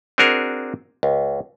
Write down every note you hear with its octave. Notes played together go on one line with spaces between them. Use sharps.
C4 D4 F#4 G#4 A#4
C#2